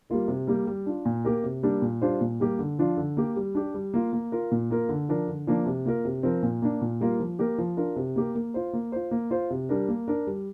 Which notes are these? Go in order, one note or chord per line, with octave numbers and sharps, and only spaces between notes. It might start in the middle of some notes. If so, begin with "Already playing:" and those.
G3 A#3 F4 A#4
C3
G3 A#3 G4
G3
D4 F4
A#2
A#3 G4 A#4
C3
G3 A#3 D4
A#2
G3 D4 F4 C5
A#2
G3 A#3 G4
D3
F3 D4 F4
D3
A#3 G4
G3
D4 G4
G3
A#3 F4
A#3
F4 A#4
A#2
A#3 F4 A#4
D3
F3 D4 A#4
D3
F3 A#3 D4
C3
A#3 F4 A#4
C3
F3 C4 A#4
A#2
A#3 D4
A#2
G3 A#3 F4 A#4
F3
A#3 G4 A#4
F3
D4 F4 A#4
C3
A#3 G4 A#4
A#3
F4 C5
A#3
F4 C5
A#3
F4 C5
C3
G3 D4 A#4
A#3
D4 A#4
G3